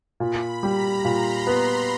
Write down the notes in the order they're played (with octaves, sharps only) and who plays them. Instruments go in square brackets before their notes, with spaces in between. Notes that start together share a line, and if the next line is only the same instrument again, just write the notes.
[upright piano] A#2 [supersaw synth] B5
[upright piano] G3 [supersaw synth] A#5
[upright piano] A#2 [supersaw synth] C6
[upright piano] B3